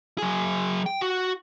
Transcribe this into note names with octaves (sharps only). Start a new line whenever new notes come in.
F#3 G#4
G5
F#4